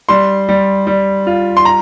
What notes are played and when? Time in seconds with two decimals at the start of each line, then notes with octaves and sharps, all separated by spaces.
0.09 G3 C6
0.49 G3
0.87 G3
1.27 F4
1.57 C6
1.65 A#5